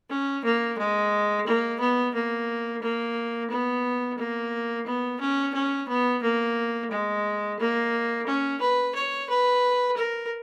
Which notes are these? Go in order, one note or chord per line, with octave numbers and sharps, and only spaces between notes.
C#4
A#3
G#3
A#3
B3
A#3
A#3
B3
A#3
B3
C#4
C#4
B3
A#3
G#3
A#3
C#4
B4
C#5
B4
A#4